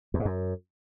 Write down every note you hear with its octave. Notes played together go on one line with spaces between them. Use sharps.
E2
G#2
F#2